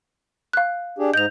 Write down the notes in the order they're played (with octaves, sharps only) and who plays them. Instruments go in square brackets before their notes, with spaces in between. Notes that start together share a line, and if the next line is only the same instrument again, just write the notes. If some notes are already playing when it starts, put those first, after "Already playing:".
[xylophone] F5 F#6
[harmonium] D4 G4 G#4
[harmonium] G#2 D#5 [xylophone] G6 F7